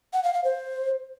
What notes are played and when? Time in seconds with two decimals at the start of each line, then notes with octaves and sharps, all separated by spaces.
0.13 F#5
0.24 F5
0.34 F5
0.44 C5